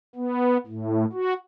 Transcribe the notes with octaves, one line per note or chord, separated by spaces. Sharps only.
B3
A2
F#4